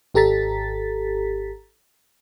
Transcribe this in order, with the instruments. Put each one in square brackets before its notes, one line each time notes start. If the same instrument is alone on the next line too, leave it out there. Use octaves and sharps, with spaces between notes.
[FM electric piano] G#1 G4 A4 A#5 A6 B6